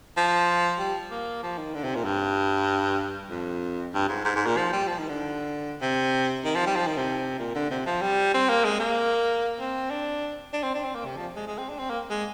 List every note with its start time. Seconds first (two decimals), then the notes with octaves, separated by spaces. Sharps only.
0.17 F3
0.80 G3
1.11 A#3
1.43 F3
1.58 D#3
1.74 D3
1.84 C3
1.95 A#2
2.05 G2
3.31 F2
3.94 G2
4.09 G#2
4.25 G#2
4.36 G#2
4.46 A#2
4.57 F3
4.72 G3
4.88 F3
4.99 D#3
5.09 D3
5.81 C3
6.44 D#3
6.55 F3
6.66 G3
6.76 F3
6.87 D#3
6.97 C3
7.39 A#2
7.55 D3
7.70 C3
7.86 F3
8.02 G3
8.34 C4
8.49 A#3
8.65 G#3
8.80 A#3
9.60 C4
9.90 D4
10.53 D4
10.63 C4
10.74 D4
10.84 C4
10.95 A#3
11.05 C3
11.17 F3
11.36 G#3
11.47 G#3
11.58 C4
11.69 D4
11.79 C4
11.90 A#3
12.10 G#3